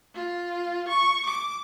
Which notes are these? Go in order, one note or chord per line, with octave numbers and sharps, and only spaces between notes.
F4
C#6
D6